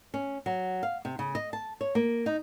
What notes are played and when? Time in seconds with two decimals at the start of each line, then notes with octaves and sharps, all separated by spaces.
0.14 C#4
0.46 F#3
0.83 F5
1.05 C3
1.19 C#3
1.35 D#5
1.53 A5
1.81 C#5
1.95 A#3
2.26 D#4